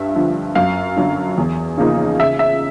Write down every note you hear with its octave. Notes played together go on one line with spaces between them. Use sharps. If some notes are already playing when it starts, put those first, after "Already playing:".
Already playing: G2 E5
D3 F3
F#2 F5
D3 F#3
E2
C#3 F3 A#3 D#4
C#3 E5
E5